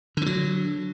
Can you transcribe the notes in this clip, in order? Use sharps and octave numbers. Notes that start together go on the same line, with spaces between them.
D3 E3 F#3